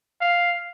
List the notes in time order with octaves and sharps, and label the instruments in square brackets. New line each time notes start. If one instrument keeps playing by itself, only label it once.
[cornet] F5